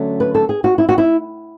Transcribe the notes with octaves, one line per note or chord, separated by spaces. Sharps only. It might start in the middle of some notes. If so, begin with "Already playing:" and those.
Already playing: D3 F#3 A3 C#4
B4
A4
G#4
F#4
E4
F#4
E4